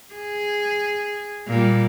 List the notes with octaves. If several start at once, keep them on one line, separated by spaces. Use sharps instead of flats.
G#4
A#2 G3